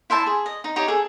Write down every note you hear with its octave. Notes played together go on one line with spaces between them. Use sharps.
E4 C5 E5 A5
G#4
D#5
D#4
D#4 G4 C#5
G#4 A4